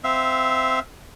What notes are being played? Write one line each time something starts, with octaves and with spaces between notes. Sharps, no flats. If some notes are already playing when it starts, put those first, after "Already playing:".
C4 E5 F5